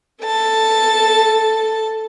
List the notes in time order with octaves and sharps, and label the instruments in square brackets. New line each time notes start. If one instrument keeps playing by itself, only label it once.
[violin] A4 A5